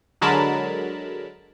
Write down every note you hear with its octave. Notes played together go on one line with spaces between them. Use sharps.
D3 F#3 G#3 A#4 A5 B5